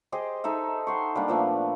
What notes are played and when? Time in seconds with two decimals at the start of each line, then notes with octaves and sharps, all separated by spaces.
0.12 G4 G#4 C5 D#5
0.44 D#4 A4 E5
0.87 F#5 C6 C#6
1.15 G3 A#3 D4
1.28 A#2 F3 A3 B3